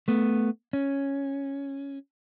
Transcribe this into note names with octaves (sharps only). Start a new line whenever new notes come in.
A3 B3
C#4